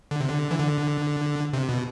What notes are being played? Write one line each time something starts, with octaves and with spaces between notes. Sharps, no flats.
D3
C3
D3
E3
D3
C3
B2